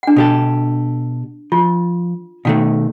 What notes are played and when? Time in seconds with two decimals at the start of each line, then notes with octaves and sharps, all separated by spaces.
0.03 D4 F#5
0.16 B2 G4 A4
1.52 F3 F4
2.45 B2 D#3 A3 F5